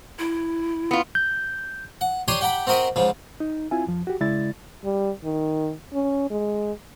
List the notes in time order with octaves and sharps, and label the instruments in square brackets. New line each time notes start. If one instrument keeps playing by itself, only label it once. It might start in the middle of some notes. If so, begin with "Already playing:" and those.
[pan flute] E4
[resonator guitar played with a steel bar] B3 F4
[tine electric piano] G6
[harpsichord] F#5
D4 G4 C#5 G#5 A#5 C6
G4 F#5 G5 A#5 B5
C4 F#4 A#4 D#5 B5
G#2 C#3 F3
[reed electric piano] D#4
C4 E4 F4 G#5
F2 F3
F#4 G4
C#3 G#3 E4 D5 A6
[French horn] G3
D#3
C#4
G#3